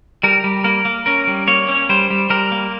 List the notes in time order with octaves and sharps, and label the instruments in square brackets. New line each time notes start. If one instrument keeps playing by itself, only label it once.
[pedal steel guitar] G3 A#4
G3
A#3 A#4
A#3
C#4 A#4
G3
A#3 C#5
C#4
G3 C5
G3
G3 A#4
A#3